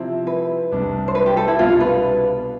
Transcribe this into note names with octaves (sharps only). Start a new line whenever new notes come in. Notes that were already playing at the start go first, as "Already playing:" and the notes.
Already playing: C3 F3 C4 E4
B4
C2 C3 G3 D4
C5
B4
G4
A4
E4
C2 B2 G3 D4 F4
B4